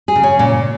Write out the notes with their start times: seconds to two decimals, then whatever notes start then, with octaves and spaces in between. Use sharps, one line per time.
0.08 G#4
0.16 C#3
0.24 C#4
0.39 A#2 C#4